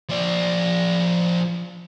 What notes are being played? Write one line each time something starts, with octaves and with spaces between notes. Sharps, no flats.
F3 D5